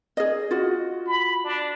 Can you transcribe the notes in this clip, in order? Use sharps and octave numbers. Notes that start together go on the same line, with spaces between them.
G#4 D#5
F4 F#4
B5
D4